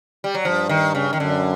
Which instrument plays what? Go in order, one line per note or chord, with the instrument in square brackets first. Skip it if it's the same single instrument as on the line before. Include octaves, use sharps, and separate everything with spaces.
[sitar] G3
F#3
[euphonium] G2 [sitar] F3
[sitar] D#3
C#3
D#3
[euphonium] F#2 [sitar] D3